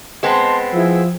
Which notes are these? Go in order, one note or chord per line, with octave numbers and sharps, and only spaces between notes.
G#3 B3 C4 D#5 A5 C6
F3 E4 G#4 E6